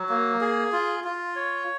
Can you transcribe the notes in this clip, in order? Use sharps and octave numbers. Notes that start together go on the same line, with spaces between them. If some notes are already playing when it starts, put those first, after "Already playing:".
Already playing: F#3
A#3
G#4
F4
F4
C#5